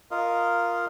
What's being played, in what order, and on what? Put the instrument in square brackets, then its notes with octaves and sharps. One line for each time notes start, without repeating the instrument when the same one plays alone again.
[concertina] F4 A#4 D#5 F5